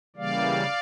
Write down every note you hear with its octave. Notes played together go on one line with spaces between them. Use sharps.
C#3 E3 G3 A#3 D5 F5